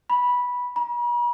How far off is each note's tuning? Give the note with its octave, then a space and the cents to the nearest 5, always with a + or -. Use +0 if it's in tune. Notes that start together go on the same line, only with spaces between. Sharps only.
B5 -10
B5 -45